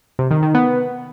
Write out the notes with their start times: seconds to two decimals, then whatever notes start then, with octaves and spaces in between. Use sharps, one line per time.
0.19 C3
0.31 D#3
0.43 D#3
0.54 B3